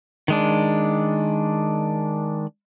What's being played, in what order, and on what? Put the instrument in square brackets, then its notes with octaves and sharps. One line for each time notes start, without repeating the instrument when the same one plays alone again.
[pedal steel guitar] D#3 G#3 D4